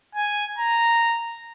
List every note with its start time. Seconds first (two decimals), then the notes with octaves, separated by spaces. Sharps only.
0.15 G#5
0.58 A#5